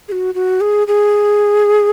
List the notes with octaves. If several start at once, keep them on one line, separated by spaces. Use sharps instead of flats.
G#4
F#4
F#4
G#4
G#4